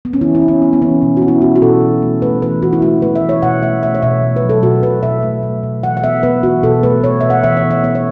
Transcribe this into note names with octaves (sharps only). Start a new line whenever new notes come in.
B3
C#4
E3 E4
E4
B3
C#4
B3
B3
E3 C#4
B2 B3
F#4
B3
E4
B3 F#4
F#4
B2 A4
E3
A3
A3 B4
E3 B4
E3 F#4
E4
A3 F#4
A3 B4
E5
E3
C#5
B2 F#5
A3 E5
A3 E5
C#5
B2 E5
A3
B4
F#3
A4
B2 F#4
B2 B4
B2 E5
A3
A3
B2
E3 F#5
F#5
B3 E5
B3 B4
E3 F#4
B2 A4
A3 B4
A3 C#5
B2 E5
F#5
E3 E5
C#5
B3
E5
B3 C#5
C#5